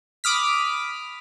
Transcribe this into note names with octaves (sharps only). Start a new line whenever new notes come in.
B5 D6 D#6 F6 B6